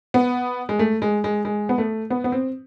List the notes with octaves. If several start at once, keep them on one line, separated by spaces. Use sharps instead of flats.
B3
G#3
A3
G#3
G#3
G#3
B3
A3
B3
B3
C4